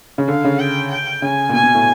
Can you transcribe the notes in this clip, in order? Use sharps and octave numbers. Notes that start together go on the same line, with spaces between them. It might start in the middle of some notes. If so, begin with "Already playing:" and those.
C#3
D3 F5
C#3
G5
G5
C#3 G#5
A#2
B2 G#5
B2
A2